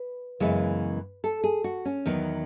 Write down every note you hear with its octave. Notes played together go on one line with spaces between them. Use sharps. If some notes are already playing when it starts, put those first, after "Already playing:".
Already playing: B4
F#2 C#3 E3 G#3 B3
A4
G#4
F#4
C#4
E2 D#3 F#3 B3